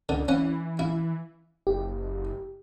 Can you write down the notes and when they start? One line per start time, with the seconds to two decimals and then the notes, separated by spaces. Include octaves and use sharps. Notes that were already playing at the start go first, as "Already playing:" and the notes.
0.09 C#2 D3
0.28 E3 C#4 F#5
0.79 E4
1.67 F#1 G4